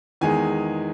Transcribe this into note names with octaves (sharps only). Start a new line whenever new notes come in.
E2 D#3 G#3 G#5